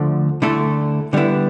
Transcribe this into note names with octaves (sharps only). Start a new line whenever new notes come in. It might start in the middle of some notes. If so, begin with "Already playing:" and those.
Already playing: D2 D3 F3 A3
D2 D3 A3 E4 A4
D3 G3 B3 E4